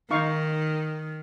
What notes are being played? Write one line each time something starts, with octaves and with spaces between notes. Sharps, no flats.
D#3 D#4 F5 C#6